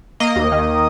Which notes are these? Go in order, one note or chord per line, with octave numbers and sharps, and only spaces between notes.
A#3 D#5
D#2
D#3